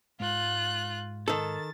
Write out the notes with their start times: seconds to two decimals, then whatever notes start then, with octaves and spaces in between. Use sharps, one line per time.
0.20 G#2 G#3 F4 F#6
1.28 D#3 A4 A6